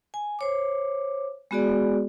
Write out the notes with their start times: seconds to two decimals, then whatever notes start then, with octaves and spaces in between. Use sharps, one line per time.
0.14 G#5
0.39 C5 C#5 D6
1.51 G#3 B3 F#4 G#4 D5